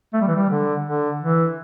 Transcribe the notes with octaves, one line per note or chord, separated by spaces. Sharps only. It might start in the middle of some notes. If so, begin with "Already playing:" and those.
A3
G3
E3
G3
D3
D3
E3